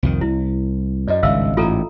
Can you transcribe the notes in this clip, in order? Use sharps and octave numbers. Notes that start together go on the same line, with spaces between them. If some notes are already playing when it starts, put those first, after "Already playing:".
C2 F2 D#3
C2 E4
F#2 D5 D#5
G#1 C#2 G2 E5 F5 E6
A1 G#2 F4 A4 A#5